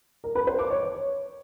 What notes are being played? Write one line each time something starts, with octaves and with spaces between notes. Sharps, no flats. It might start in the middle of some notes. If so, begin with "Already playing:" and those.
A#4
B4
C5
D6
C#5